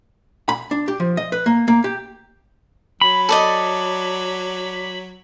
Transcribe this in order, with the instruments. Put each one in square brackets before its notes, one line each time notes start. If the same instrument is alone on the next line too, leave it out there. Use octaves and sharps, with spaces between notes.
[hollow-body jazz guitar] B5
D4
G4
F3
D#5
B4
A#3
A#3
G4
[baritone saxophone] F#3 [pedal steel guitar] B5
[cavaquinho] A4 D5 D#5